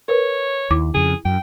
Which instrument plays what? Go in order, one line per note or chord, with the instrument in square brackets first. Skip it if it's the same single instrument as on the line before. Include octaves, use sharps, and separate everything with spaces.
[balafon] A#4 B4 [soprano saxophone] C#5
[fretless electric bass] D#2 [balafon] E4 D6
[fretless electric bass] F2 C#3 [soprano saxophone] G#4
[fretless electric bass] F#2 [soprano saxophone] G5